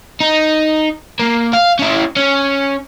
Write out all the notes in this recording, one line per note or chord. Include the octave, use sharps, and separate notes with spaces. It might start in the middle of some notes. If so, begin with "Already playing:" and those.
D#4
A#3
F5
C#4 E4
C#4